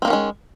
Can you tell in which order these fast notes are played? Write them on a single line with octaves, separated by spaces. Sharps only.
C4 A#3 D#3 C#4 G#3